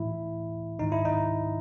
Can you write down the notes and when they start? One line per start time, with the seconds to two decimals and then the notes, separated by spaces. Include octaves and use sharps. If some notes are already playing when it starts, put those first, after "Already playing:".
Already playing: A2 E3 E4
0.79 G#2 D#3 D#4
0.92 E4
1.05 D#4